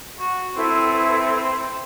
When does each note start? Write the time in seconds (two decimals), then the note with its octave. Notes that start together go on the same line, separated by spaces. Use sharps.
0.20 F#4
0.56 C4 E4 A4 B4